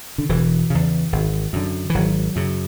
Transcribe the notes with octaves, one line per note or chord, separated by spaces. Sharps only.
D3
E1 E3
E2 C#3
G#1
F#2 D3
E3
G#1 F#3
F#2 C#3